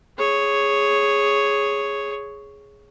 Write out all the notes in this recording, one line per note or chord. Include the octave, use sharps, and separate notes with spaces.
G#4 C#5